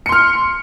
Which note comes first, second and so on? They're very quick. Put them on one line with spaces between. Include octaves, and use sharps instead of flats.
C#7 C6 F6